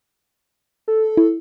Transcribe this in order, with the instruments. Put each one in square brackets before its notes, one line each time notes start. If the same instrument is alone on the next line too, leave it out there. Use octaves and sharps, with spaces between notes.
[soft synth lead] A4
[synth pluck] E4